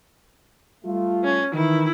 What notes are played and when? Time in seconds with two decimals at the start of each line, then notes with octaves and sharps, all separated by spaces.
0.85 G3 A3 F4
1.24 C#4
1.54 D#3 E3 E4